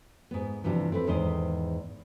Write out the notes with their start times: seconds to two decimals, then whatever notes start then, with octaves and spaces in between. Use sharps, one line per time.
0.31 G#2 B3
0.64 G2 C3 E3 F3 G3 D4
0.92 C4 A4 B4
1.07 E2 G#2 D#3 C5 D#5